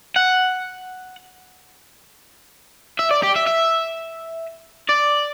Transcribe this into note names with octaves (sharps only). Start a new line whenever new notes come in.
F#5
E5
D5
G4
E5
E5
D5